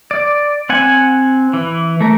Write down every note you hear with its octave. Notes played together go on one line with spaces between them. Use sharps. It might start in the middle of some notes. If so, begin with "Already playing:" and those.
D5
C4 F#5 G#5
E3
A3 A#4